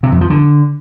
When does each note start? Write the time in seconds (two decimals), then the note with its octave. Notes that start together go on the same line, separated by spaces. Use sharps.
0.03 C3
0.12 F2
0.21 F3
0.30 D3